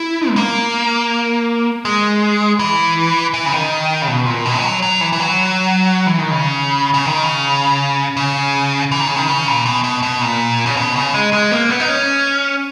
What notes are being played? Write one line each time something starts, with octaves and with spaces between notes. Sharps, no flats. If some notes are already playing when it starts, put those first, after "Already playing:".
Already playing: E4
G#3
A#3
G#3
E3
E3
C#3
D#3
C#3
B2
A#2
B2
G#3
F#3
F#3
E3
E3
F#3
E3
D#3
C#3
C#3
D#3
C#3
C#3
E3
D#3
C#3
D#3
C#3
A#2
B2
B2
B2
A#2
C#3
B2
C#3
G#3
G#3
A#3
B3
D#4
C#4